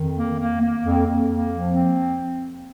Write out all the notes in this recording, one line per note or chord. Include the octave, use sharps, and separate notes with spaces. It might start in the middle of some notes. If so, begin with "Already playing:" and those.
Already playing: F2 D#3
A#3
A#3
A#3
F2
F2
A#3
F3
C4